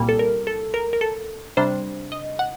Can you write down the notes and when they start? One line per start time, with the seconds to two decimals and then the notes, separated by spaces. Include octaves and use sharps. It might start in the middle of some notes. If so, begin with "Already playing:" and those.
Already playing: C2 A#2 G3 A#3
0.09 A4
0.19 A#4
0.47 A4
0.74 A#4
0.93 A#4
1.01 A4
1.57 C3 G3 D4 C5
2.12 D#5
2.39 F#5